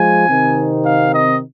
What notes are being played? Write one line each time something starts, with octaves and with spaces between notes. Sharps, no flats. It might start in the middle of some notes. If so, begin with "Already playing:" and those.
Already playing: F3 G#3 G#5
C3 D#3 C4 D#4
F5
D#5